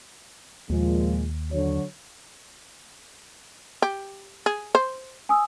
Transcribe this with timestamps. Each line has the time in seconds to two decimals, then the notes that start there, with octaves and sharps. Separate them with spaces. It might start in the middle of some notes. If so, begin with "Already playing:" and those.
0.70 D#2 A#2 F3 G#3
1.52 D3 F#3 C#5
3.82 G4
4.46 G#4
4.75 C5
5.29 G#5 D#6 E6